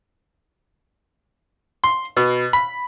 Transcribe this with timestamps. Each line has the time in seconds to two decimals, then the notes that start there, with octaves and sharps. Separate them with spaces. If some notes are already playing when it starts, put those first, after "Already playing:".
1.84 C6
2.17 B2
2.53 B5